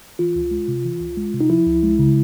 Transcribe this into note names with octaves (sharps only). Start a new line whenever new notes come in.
E3 F4
C#2
G#3
C3
E3
C#2
G#3
C3
D#4
F3 E4
C#2
G#3
C#3